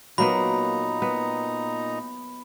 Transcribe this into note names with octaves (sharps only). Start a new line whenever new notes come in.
A#2 F#3 A#3 B3 D#4 A#5 B5
B3